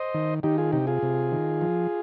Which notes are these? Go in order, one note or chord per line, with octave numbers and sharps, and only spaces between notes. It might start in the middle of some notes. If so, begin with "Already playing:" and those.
Already playing: C5 D#5
D#3
D#3 D#4 G4
F4 G#4
C3 D#4 G4
F4 G#4
C3
D#3
F3